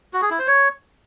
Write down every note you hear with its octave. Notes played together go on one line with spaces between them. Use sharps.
F#4
G#4
E4
C5
C#5